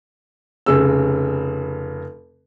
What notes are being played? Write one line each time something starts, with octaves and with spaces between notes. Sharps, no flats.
F1 C#3 G#4 E6